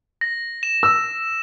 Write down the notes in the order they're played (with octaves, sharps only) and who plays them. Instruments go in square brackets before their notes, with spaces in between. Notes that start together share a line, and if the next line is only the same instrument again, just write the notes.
[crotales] A#6
E7
[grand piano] E6